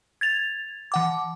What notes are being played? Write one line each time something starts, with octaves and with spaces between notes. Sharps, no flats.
G#6 A6 F7
E3 F#5 D6